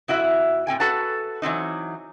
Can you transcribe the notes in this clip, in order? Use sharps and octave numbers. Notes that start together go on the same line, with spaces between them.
F2 E4 F#4 E5
A2 C4 G5 G#5
F#4 A4 B4 F#5 A5
E3 F#3 C4 D#4